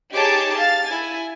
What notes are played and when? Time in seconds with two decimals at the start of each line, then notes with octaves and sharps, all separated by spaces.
0.13 D#4 G4 G#4 C#5 A5 D6
0.57 F5 A6
0.89 E4 G#5